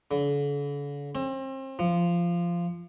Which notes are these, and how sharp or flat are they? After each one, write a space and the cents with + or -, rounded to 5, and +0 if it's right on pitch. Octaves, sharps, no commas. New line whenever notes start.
D3 -45
C4 +35
F3 -15